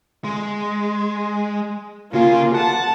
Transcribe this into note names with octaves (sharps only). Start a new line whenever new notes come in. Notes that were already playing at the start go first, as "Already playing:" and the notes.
G#3
C#3 A#3 F4 G#4
F#5 A5